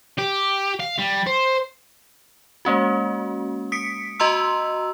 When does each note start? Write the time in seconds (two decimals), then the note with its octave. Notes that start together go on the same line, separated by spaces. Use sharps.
0.18 G4
0.80 F5
0.99 G3
1.27 C5
2.65 G#3 A#3 C#4 F#4
3.72 D#6 B6 C#7 D7
4.20 F#4 D#5 A#5 C6 E6